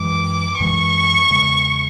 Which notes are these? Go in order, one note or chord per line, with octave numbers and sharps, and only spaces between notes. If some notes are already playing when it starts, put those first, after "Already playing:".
Already playing: F#2 E3 G#3 D6
F#2 E3 G#3 C#6
E2 C#3 G#3